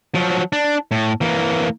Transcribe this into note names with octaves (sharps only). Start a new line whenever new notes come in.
F3 F#3
D4
A2
E3 A#3